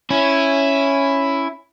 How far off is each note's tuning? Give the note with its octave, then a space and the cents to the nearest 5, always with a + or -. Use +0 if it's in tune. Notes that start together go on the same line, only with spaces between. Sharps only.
C#4 +0 E4 +5